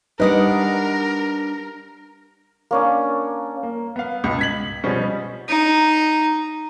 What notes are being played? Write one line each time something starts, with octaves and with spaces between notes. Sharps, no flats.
G3 D4 D#4 A#4 B4 D#5 F#5
A#3 C#4 D4
A#3
B3 F5
C#2 B2
G#6 B6 F#7
B2 F3 G3 G#3 C4 C#4
D#4